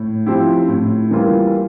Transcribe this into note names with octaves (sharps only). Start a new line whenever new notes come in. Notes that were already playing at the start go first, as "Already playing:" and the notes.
Already playing: A2
F3 C4 E4 G4
A2
E3 G3 A#3 F4